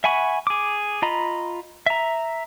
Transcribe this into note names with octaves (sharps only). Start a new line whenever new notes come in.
E5 F#5 G#5 B5 C#6
G#4 D6
F4 D#5 A#5 B5
E5 A#5